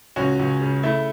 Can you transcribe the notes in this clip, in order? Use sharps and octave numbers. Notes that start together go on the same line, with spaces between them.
C#2 C#4 F#4
C#2
C#3
A3 E4